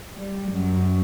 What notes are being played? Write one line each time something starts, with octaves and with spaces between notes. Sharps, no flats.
G3
F#2